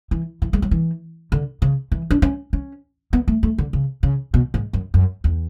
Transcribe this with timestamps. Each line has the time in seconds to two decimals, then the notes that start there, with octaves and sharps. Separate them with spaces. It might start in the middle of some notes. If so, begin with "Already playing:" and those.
0.11 E3
0.42 E3
0.53 G#3
0.62 F#3
0.71 E3
1.32 D3
1.62 C#3
1.92 E3
2.11 D4
2.22 C#4
2.53 C#4
3.13 B3
3.28 A3
3.43 A3
3.58 D3
3.73 C#3
4.03 C#3
4.34 B2
4.54 G#2
4.73 F#2
4.94 F#2
5.24 E2